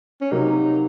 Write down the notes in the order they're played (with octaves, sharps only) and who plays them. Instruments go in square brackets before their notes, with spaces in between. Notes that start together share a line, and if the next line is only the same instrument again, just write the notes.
[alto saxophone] C#4
[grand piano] C3 F#3 A#3 [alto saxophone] D#4